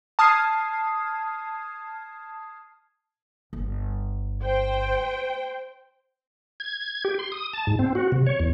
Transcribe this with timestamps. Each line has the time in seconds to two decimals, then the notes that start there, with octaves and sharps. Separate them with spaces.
0.19 A5 D#6 F6 G#6 C7
3.53 G1
4.43 C5 G5
6.60 G#6
6.81 G#6
7.05 G4
7.19 C6
7.32 D#6
7.53 A5
7.67 G#2
7.79 C4
7.95 F#4
8.12 C3
8.27 C#5
8.40 E2